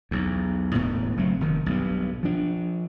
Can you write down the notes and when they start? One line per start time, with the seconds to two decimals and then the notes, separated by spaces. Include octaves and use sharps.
0.11 B1 E2
0.74 E1 D2 A2 B3
1.17 F#1 F#3 A3 C4
1.40 F1 D#3
1.66 B1 G2
2.23 F3 D4